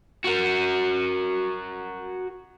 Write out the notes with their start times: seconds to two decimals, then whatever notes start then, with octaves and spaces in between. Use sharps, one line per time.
0.25 F#4 A#4